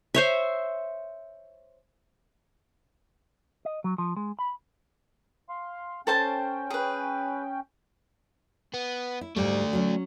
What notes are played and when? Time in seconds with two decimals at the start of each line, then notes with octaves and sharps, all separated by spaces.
0.14 C5 C#5 E5
3.65 D#5
3.84 F#3
3.98 F3
4.17 G#3
4.39 B5
5.49 F5 C6
6.07 C#4 A4 C5 G5 A5
6.70 G#4 B4
8.74 B3
9.21 E4
9.36 G#2 G3 A3 D5
9.73 F#3 C#4